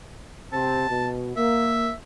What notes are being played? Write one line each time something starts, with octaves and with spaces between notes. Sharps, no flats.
C3 C4 A5
B2
A#3 E5